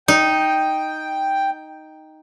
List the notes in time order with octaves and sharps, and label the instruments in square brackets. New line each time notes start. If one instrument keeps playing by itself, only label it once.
[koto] D#4 [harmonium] G5